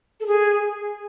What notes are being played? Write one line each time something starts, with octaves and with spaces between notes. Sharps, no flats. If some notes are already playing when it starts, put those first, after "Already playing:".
A4
G#4